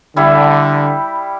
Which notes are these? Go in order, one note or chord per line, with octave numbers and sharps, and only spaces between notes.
D3 G3 E4 G4